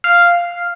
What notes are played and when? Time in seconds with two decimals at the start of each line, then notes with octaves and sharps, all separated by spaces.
0.04 F5